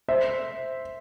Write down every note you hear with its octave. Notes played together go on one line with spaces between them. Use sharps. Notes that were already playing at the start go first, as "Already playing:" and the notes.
C5 E5